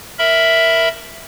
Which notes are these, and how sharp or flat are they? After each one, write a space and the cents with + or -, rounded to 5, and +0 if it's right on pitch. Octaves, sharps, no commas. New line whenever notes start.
A#4 +0 E5 +0 B5 +0